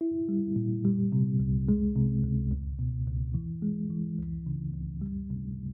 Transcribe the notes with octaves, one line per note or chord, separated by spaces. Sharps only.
E4
G3
A#2
G3
C3
C2
G#3
C3
C#2
C#2
B2
C#2
E3
G#3
E3
C#2
C#3
C#2
G3
C3